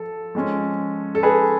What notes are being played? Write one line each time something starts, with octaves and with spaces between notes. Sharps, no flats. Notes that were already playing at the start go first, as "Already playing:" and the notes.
Already playing: F3 A4
F3 G#3 C#4
A4
G#4 B4